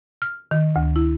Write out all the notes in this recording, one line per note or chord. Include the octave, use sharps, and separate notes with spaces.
F6
D#3
D2
E4